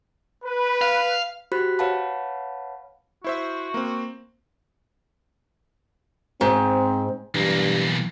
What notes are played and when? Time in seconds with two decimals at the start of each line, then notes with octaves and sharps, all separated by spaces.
0.45 B4
0.81 F5
1.52 F#4 G4 C5 B5 F#6 B6
1.79 B4 C#5 F5 F#5 A5 B5
3.24 E4 F#4 C5 E5
3.74 A#3 C4
6.41 G#2 C4
7.35 B1 G2 E3 A#3